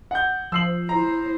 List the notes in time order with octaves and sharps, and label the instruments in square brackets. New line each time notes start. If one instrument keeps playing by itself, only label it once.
[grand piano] F#5 G6
[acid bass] F3 [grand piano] E6 C7 F#7
[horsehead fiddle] E4 C5 [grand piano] A#5